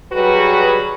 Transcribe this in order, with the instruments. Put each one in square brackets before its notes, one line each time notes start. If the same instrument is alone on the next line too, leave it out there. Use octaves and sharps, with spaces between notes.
[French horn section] F#3 G3 F#4 G#4 B4